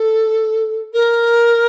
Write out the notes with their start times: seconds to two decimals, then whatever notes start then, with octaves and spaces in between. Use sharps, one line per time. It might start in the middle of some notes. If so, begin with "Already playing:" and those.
Already playing: A4
0.93 A#4